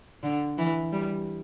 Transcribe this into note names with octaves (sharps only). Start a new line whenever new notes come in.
D3
E3
G3